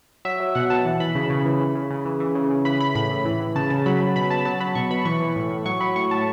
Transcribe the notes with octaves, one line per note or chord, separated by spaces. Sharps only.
F#3 E5
F#3
B2 F#5
B2 A5
E3
E3 B5
C#3
C#3
E3
E3
C#3
C#3
E3
E3
C#3
C#3
E3 B5
E3 B5
A2 B5
A2
E3
E3
C#3 A5
C#3 A5
F#3 B5
F#3
B2 B5
B2 A5
F#3 A5
F#3 B5
B2 C#6
B2 B5
E3 C#6
E3
A2
A2
F#3 C#6
F#3 B5
A2 C#6
A2 A5